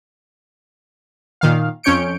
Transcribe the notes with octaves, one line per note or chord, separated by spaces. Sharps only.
A#2 D#3 F5
F2 C#4 C#5 G6 C#7 D7